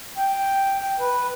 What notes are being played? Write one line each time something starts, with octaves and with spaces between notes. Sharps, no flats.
G5
B4